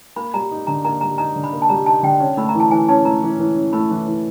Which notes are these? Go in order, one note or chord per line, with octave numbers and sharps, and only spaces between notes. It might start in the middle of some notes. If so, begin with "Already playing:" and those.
A#3 B5
G3 A#5
D#4
D3 A#5
A#3 A#5
G3 A#5
D#4 A#5
D3
B5
A#3
A5
G3 A#5
D#4 A5
D3 G5
C#4
A3 B5
A#5
E3
A5
E3 G#5
C#4 A5
A3 A#5
E3
E3
C#4
A3 B5
E3
E3